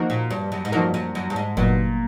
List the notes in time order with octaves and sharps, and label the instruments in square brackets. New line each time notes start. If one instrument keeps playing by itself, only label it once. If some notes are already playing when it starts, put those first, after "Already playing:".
Already playing: [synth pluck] F3 A#3 D#4 F#4 A#4
[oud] A#2
G2
F#2
G#2
[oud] G2 [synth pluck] F3 A#3 D#4 F#4 A#4
[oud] F#2
F#2
G2
G#2
[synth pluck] G1 G2 D#3 F#3 B3 [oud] A#2